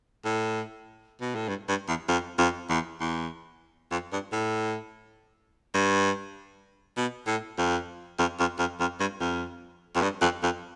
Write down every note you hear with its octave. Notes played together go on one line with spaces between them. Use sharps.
A2
B2
A2
G2
G2
E2
F2
F2
E2
E2
F2
G2
A2
G2
B2
A2
F2
F2
F2
F2
F2
G2
F2
F2
G2
F2
F2